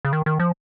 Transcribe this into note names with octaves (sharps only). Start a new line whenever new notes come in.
C#3
D#3
D#3
F3